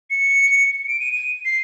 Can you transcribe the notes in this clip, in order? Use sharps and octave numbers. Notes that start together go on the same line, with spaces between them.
C#7
D7
D#7
D#7
C7